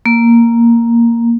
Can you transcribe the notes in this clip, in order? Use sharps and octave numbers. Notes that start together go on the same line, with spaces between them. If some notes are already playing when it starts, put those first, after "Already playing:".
A#3